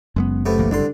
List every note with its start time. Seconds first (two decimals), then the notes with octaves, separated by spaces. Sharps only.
0.16 F#1 F#2 G#3 A3 B3
0.46 C3 A3 B3
0.58 B1 E3 A#3
0.71 C2 D3 D4 C6